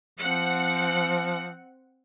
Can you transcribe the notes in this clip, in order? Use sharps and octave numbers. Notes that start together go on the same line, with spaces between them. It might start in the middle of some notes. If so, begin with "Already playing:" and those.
F3 C4 F#5